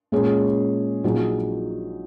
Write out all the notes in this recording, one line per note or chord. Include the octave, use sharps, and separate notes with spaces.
A#2 G#3 C#4 G#4 C#5
A#1 A#2 F#3 D#4 G#4